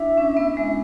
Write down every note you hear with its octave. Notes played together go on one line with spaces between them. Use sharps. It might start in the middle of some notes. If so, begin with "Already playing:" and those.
Already playing: D4 E4 E5
C#4
B3
G#3